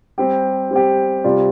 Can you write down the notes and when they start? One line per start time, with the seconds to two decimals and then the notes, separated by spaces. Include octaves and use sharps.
0.18 G3 C4 G4
0.71 G3 C4 G4
1.24 C3 G3 F4 D5